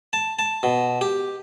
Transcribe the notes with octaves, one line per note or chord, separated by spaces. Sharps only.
A5
A5
B2
G4